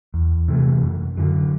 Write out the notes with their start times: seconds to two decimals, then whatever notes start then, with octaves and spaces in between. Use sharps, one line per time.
0.14 E2
0.48 C3 E3 A3
0.83 F#2
1.17 D3 F#3